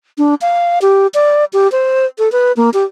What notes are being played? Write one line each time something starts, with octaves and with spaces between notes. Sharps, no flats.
D4
F5
G4
D5
G4
C5
A4
B4
A#3
G4